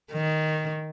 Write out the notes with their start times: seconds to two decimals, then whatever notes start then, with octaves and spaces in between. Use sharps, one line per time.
0.13 D#3